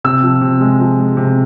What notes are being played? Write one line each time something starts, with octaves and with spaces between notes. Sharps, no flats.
C3 E6
F3
C3
G#3
F3
G#3
C3